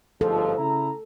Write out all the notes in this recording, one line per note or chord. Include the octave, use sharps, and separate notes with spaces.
G1 G#2 F3 A4
C#3 E4 A#5